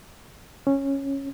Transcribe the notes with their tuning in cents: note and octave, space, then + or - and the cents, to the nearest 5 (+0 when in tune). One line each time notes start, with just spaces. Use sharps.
C#4 -10